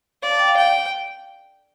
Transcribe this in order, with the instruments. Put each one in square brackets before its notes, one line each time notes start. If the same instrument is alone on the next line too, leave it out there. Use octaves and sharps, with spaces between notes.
[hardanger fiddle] D5 [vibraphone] F5
[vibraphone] A5
G5
F5
[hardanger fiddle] G5